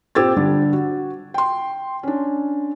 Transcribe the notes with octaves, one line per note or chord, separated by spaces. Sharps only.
A#2 C4 G4 E6 G#6 A6
D3 G3 D4
F#4
G5 C6
C#4 D4